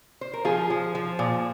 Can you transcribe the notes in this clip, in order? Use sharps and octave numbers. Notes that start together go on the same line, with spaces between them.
C5
A#4
F3 F4 G#4
F3
F3
A#2